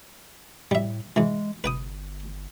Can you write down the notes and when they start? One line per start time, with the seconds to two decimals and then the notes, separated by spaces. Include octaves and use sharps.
0.71 A2 G3 E5
1.16 G#2 E3 G#3
1.64 G1 B4 G5 D#6